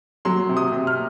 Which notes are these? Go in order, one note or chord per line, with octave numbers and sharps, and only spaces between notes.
F#3 C6
C3
D#6
C3
F6